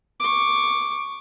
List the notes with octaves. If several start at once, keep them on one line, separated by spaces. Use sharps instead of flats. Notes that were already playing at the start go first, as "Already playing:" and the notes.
C#6 D6